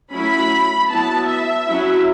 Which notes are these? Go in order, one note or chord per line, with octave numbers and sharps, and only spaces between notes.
F#3 A3 C#4 E4 B5
F#3 B3 E4 A5
E5
F#3 C#4 E4